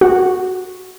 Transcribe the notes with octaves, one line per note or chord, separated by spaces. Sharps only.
F#4